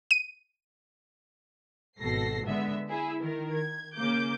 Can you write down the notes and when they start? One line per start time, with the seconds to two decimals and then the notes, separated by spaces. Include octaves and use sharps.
0.11 D#7
2.00 G#1 B2 A4 A#6 C7
2.46 D3 G#3 B3 E5
2.89 E4 G#4 E5
3.21 D#3 A#4
3.52 G#6
3.95 C#3 A#3 D6 G6